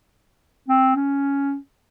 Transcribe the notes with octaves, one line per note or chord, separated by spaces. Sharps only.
C4
C#4